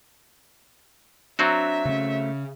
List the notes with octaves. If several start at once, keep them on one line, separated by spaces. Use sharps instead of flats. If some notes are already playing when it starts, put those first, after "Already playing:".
F#3 C4 D4 F#4 E5 A#5
C#3 A3 C#4